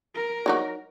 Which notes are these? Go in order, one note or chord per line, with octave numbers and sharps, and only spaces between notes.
A#4
F#3 D#4 F#4